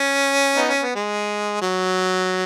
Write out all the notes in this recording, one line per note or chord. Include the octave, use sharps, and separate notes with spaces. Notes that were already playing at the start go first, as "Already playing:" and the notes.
Already playing: C#4
B3 D#4
C#4
B3
G#3
F#3